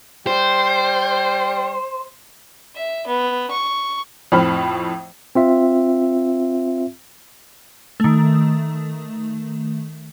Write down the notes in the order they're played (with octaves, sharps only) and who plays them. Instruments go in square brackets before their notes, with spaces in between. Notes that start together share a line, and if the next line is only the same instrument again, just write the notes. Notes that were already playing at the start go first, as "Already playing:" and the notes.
[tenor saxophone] G3 [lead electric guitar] C5
[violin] E5
B3
C#6
[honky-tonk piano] F2 A2 C4 B5 F6
[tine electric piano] C4 F4 E5
[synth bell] D#3 A3